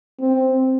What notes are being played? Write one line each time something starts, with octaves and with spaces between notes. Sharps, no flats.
C4